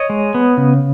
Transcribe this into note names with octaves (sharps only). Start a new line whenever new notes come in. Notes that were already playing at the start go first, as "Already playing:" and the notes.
Already playing: C#5 D#5
G#3
B3
C#3